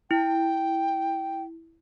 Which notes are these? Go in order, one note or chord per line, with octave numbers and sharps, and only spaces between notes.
E4 G5